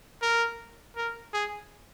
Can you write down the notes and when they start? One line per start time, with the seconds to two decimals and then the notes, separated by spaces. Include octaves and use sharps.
0.22 A#4
0.97 A#4
1.34 G#4